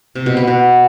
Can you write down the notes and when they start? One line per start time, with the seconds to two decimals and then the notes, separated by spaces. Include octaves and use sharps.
0.15 C3
0.26 B2
0.37 B3
0.47 B2